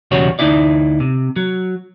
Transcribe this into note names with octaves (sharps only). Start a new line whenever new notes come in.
B1 E2 C#3 G3 F#4 C#5
D2 D#4 E4 D5
C3
F#3